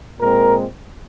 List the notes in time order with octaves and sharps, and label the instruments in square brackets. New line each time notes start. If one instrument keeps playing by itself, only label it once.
[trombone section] A#2 G#3 C4 A#4